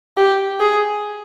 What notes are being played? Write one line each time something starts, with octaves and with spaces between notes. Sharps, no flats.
G4
G#4